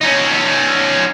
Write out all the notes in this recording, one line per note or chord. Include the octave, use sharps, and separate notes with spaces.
C#4 D#4